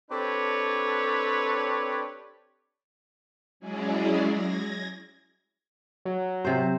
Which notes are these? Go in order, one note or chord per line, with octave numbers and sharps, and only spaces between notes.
C4 D4 G4 A4 B4 C#5
F#3 G#3 C#4 E4 G#4 D5
G#6 A#6
F#3
C3 C5